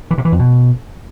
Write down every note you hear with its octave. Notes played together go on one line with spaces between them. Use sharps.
E3
C3
E3
F2
B2